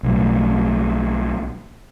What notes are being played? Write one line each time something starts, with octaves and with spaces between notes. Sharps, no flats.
B1 A2